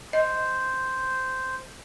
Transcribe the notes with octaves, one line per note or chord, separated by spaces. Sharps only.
C5 D#5